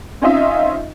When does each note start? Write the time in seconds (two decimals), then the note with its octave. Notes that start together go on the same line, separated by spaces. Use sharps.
0.22 C4 C#4 D#4 F4 D#5 E5